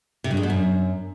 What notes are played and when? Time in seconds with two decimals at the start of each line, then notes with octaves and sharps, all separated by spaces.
0.24 C3
0.31 G2
0.37 G#3
0.43 B2
0.50 F#2